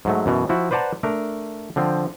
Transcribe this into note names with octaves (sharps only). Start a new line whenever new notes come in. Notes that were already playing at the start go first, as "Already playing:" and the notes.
G#2 F#3 A3
F#2 B2 E3
F3 E4 F#4
B4 C5 D5 F#5 A5 A#5
A3 D4 A#4
D3 F3 C4